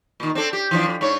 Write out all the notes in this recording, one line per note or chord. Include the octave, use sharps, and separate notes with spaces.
A#2 D#3
C4 D4 A4
G4
E3 F3 D4
F2
G#2 D4 C#5